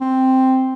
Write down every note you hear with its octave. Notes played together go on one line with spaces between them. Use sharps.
C4